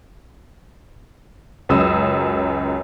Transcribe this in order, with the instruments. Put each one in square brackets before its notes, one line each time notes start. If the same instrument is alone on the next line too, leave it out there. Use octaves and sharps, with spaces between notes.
[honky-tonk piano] C#2 F#2 D#6 E6